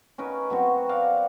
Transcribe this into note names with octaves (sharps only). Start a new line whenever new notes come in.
C#4 D#4 A#4 B4
F#3 B3 C4 F#4
A#4 D5 F5 F#5